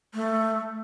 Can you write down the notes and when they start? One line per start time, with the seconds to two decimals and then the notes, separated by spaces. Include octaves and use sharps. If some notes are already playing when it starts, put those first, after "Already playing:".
0.14 A3